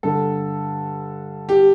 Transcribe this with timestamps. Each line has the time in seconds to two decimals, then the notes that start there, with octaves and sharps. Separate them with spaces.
0.03 G2 D3 A4
1.49 G4